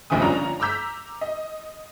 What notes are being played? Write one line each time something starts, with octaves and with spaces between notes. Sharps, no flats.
F1 A#1 E2 C#3 G#5 D#6
F2 D3 F3 C#4 D4 A#5
A#5 D6 E6 G6 B6
D#5